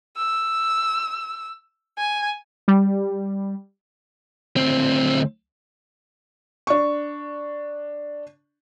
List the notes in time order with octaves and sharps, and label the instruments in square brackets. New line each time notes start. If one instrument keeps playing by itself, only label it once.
[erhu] E6
G#5
[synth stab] G3
[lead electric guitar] D2 C4
[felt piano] D4 C#6